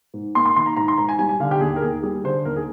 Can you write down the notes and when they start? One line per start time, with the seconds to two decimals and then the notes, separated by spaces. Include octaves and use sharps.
0.14 G#2
0.35 A#3 C6
0.46 C6
0.56 D#3 C6
0.66 A#5
0.76 G#2 A#5
0.88 C6
0.98 G#2 A#5
1.09 G#5
1.19 G3 G#5
1.29 G#5
1.40 D3 F5
1.51 G4
1.61 D#2 G#4
1.76 A#4
1.82 D#2 G#4
2.03 G3 G#4
2.24 D3 C5
2.45 D#2 A#4
2.56 G#4